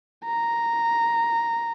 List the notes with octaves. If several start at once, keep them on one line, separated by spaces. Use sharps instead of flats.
A#5